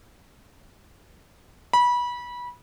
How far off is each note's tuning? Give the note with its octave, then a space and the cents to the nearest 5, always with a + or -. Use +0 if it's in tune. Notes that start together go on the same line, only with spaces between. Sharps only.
B5 -25